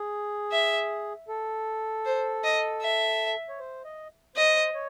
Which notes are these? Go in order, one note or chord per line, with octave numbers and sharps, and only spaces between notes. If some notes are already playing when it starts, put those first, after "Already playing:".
Already playing: G#4
E5
A4
C5
D#5
E5
C#5
C5
D#5
C5 D#5
C#5